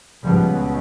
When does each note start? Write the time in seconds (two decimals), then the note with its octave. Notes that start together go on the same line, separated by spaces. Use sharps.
0.24 C#2 B2 F3 G3